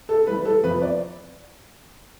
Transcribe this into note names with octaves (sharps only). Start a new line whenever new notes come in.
A4
E3 G3 B4
A4
F2 B4
D5